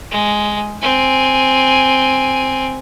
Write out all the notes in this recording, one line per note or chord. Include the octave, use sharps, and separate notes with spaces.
G#3
C4 G#5